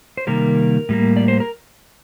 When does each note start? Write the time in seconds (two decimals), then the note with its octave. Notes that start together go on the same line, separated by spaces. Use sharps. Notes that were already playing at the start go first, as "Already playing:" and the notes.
0.17 C5
0.27 C3 D#3 G3 A#3 A#4
0.89 A2 G3 A#3
1.17 D5
1.28 C5
1.40 A#4